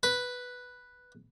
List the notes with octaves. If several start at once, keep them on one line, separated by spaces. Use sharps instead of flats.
B4